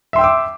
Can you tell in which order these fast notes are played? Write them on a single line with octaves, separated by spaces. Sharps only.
E5 C6 G5 E6 D6